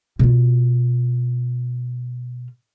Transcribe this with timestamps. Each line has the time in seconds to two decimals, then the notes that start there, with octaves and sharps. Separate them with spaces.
0.19 B2 F4